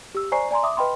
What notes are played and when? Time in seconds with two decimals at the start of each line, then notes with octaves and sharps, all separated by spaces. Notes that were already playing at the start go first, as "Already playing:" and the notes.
0.15 G4 E6
0.32 C5 D5 G#5 A#5 C#6 C7
0.51 D5 G#5 A#5 C6
0.63 E5 D6 D#6
0.77 B4 D#5 G5 B5 C6